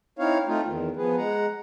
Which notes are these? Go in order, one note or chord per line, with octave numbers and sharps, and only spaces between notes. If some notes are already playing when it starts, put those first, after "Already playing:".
C4 D#4 E4 C#5 F5
A3 C4 D#4 F4
E2 D#3
F3 B3 G#4 B4
G#3 F#5 A#5